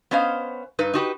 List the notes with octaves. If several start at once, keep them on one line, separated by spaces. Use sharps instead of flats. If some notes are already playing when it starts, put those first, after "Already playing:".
B3 C#4 C5 D#5 F5
G2 D#4 B4
D#4 F#4 G4 B4